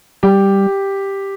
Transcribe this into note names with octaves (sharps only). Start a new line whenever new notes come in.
G3 G4